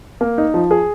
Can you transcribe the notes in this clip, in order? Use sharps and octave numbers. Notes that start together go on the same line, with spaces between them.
A#3
D#4
F3
G#4